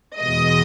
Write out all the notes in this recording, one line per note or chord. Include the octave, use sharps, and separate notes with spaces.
E2 B2 G#3 D#5